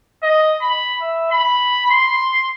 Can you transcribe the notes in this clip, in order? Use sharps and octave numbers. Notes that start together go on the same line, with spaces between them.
D#5
B5
E5
B5
C6